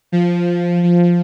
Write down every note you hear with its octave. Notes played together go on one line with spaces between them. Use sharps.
F3
F3